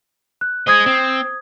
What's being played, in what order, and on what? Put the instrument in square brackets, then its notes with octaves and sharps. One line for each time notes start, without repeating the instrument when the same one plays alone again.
[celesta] F#6
[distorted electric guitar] G#4 D#5 [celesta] C5 D#6 G#6
[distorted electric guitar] C4